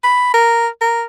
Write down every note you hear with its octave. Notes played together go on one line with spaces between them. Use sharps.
B5
A#4
A#4